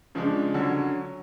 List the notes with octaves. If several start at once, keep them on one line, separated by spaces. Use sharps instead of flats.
C#3 F3 G#3 D4
D3 F#3 C#4